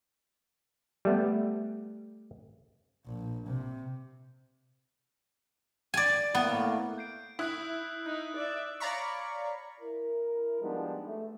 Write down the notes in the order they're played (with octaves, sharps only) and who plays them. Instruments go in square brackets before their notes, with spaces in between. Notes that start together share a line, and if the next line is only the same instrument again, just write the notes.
[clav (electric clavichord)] G3 A3 B3
[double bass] A#1
C3
[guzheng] D5 G#5
[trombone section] A2 A#3 [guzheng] B3
[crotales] G6 C7 D7
[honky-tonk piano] E4 [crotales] D#6 F#6 F#7
[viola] D#4 [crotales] F#6
[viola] D5 E5
[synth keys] C#5 D5 F5 A#5 B5 C#6
[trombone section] E4 A#4
F3 G3 G#3 B3 D4 D#4
A3